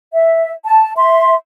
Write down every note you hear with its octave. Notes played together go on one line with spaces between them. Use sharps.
E5
A5
E5 C6